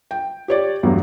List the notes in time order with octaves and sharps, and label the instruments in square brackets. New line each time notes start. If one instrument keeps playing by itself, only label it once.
[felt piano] G5
G4 C#5 D5
E2 G2 F#3 A3